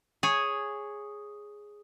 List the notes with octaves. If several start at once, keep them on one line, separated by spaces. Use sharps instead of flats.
G#4 C#5